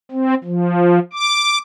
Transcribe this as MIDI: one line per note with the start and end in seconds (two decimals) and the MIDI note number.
0.11 0.35 60
0.44 0.99 53
1.13 1.58 86